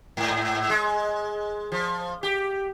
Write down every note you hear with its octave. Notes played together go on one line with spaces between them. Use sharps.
G#2
G#3
F3
G4